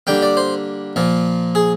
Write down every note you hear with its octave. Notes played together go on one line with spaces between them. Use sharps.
D3 G3 A#3 G5
D5
C5
A#2 F3 A#3
G#4